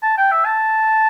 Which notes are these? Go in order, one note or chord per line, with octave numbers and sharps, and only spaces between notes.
A5
G5
E5
A5